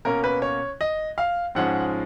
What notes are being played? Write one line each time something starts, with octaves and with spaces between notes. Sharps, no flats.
B2 A#3 C#4 A#4
B4
C#5
D#5
F5
G#2 F3 G#3 C#4 F#5